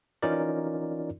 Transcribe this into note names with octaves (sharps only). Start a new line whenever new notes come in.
E3 C#4 D#4 F4 A#4 D5